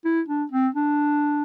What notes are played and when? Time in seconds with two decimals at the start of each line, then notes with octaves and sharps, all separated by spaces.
0.05 E4
0.28 D4
0.52 C4
0.74 D4